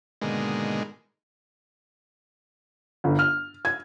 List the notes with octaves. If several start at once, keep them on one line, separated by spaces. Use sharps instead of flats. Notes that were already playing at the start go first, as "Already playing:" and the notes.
G#2 B2 D3 D#3 G#3 A#3
G1
F6
G#6